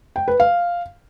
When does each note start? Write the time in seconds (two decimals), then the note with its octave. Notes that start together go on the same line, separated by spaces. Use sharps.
0.16 G5
0.28 B4
0.40 F5